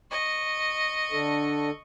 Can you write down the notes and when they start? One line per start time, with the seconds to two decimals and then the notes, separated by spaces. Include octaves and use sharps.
0.11 D#5 C#6
1.12 D3 D4 A4